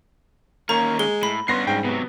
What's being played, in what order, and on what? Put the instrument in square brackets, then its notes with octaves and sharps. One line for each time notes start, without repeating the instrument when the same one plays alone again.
[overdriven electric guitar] D#2 C#4 [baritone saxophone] A#3 [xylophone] A#5 C#6
[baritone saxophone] G#3 [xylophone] G7
[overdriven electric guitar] A2 [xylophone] B5
[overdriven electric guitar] G2 C#4 [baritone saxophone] B3 [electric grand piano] C6 A#6 C7
[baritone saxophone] G#2 [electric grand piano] G5
[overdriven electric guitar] C3 F#3 [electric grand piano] B3